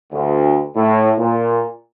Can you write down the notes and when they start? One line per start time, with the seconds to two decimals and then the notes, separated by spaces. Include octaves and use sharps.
0.13 D2
0.76 A2
1.19 A#2